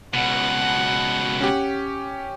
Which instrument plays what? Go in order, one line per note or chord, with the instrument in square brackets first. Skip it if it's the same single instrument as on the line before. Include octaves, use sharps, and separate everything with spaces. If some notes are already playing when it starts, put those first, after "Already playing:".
[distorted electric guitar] C#2 B2 [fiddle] F#5
[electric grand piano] C#4 G4